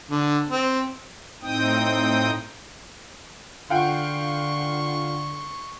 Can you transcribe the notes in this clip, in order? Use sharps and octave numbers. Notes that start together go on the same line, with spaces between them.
D3
C4
A2 C4 D#4 G5 D#6
D3 F4 F#5 G5 C6 C#6